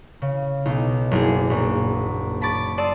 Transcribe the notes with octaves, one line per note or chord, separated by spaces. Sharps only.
C#3
B1 D#4
F#1 G#4
A#1
A5 B5 C#6 D6 A6
D5 A5 C6 D#6 E6